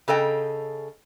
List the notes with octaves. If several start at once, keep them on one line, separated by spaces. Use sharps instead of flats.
C#3 A4 D#5 G5